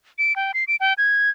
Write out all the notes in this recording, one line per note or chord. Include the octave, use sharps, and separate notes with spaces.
D7
G5
C7
D7
G5
G#6